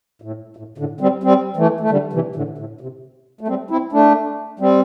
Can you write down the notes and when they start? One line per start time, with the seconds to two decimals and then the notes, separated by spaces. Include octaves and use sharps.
0.22 A2
0.57 A2
0.78 A2 D3
1.01 G3 C4
1.23 G3 C4
1.56 E3 A3
1.80 A3
1.90 D3 G3
2.13 C3 E3
2.35 A2 D3
2.58 A2
2.81 C3
3.41 A3
3.48 G3 C4
3.71 C4 E4
3.93 A3 D4
4.60 G3 C4